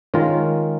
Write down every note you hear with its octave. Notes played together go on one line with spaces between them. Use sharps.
D#3 G#3 C#4 F4 A#4